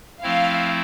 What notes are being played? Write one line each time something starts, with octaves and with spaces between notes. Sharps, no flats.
F3 A3 C4 E4 F5